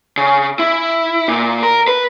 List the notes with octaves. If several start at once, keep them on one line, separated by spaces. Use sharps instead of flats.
C#3
E4
A#2
A#4
B4